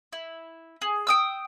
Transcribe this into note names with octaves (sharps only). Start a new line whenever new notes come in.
E4
G#4
G5 D#6 E6